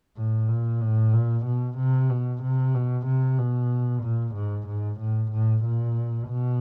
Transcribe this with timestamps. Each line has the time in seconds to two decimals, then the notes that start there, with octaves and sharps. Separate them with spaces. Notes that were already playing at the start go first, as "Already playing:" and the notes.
0.17 A2
0.49 A#2
0.81 A2
1.14 A#2
1.45 B2
1.78 C3
2.10 B2
2.43 C3
2.74 B2
3.07 C3
3.38 B2
4.03 A#2
4.35 G#2
4.68 G#2
5.00 A2
5.32 A2
5.64 A#2
6.28 B2